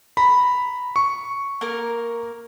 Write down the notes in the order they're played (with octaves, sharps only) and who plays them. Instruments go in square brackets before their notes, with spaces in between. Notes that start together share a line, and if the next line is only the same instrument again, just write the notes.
[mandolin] A#5 [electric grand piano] B5
[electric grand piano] C#6
[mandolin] A#3 A#4